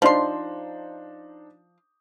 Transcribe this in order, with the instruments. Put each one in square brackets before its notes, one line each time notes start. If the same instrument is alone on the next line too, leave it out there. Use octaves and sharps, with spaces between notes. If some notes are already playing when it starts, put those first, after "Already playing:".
[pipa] F3 C6 [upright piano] D4 D#4 C5